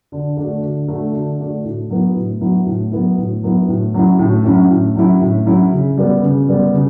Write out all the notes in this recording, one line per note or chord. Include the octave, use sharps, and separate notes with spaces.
D3
A3 D4 F#4
D3
A3 D4 F#4
D3
A3 D4 F#4
A2
F#3 B3 E4
A2
F#3 B3 E4
A2
F#3 B3 E4
A2
F#3 B3 E4
A2
F#3 C#4 E4
A2
F#3 C#4 E4
A2
F#3 C#4 E4
A2
F#3 C#4 E4
C#3
G3 B3
C#3
G3 B3
C#3